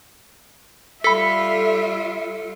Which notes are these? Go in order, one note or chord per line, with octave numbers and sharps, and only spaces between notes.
G3 F4 A4 E5 B5 B6